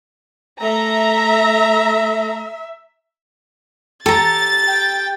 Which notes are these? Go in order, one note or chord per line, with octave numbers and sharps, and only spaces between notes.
A3 E5 A#5
G4 A4 A#5 A6
G5